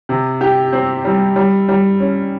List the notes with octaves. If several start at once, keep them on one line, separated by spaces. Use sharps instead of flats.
C3
G4
C4
G3
G3
G3
C#4